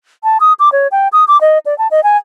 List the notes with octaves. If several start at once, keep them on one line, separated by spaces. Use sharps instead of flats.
A5
D#6
D6
C#5
G5
D#6
D6
D#5
D5
A5
D#5
G#5